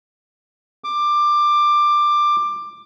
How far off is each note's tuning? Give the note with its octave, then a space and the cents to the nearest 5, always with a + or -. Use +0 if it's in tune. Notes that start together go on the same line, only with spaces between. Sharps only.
D6 +15